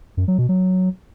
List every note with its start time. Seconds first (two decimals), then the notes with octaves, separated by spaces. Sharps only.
0.17 F#2
0.28 F#3
0.38 B2
0.49 F#3